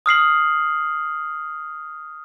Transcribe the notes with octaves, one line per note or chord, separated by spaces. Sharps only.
D#6 F6 C7 F#7